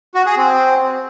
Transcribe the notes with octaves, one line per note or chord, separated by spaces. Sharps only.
F#4
G#4
C4